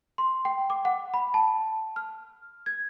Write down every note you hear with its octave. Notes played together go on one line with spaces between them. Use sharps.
C6
G5
D6
F#5
B5
A5
F6
G#6